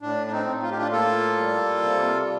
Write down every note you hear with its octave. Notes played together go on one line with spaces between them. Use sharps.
A2 D4
D4
C4 D#4
A2
F4
G4
D4 F4
A#3 F4 A4
G3
C3